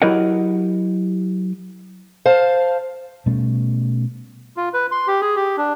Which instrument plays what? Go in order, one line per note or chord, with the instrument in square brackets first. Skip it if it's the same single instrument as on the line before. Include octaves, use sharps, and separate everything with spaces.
[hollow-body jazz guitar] F#3 E4 G4 A#4 D#5 F#5
[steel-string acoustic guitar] C5 F5 A5
[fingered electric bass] B2 G3 A3 C#4
[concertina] F4
B4
C6
G4
G#4
G4
D4